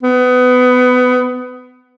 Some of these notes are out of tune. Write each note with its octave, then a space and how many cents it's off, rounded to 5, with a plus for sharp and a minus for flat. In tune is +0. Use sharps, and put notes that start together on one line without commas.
B3 +25